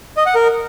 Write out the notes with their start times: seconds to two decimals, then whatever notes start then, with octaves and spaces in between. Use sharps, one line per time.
0.17 D#5
0.26 F#5
0.35 A#4